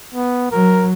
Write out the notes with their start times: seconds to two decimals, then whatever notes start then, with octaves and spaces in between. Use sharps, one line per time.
0.15 B3
0.52 F#3 A#4